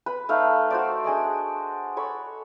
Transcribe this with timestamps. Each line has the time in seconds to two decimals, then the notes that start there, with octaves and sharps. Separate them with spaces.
0.06 B4 B5
0.29 A3 D#4 F5
0.71 F#4 C5 D5
1.04 D4 G#4 D5 D#5
1.97 A4 C#5 B5